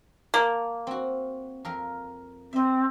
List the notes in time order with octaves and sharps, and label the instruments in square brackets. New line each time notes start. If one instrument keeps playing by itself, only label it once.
[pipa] A#3 [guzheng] A5
[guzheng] C4 F#4
F2 A#4 F5
[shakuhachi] C4 [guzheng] D#5 E5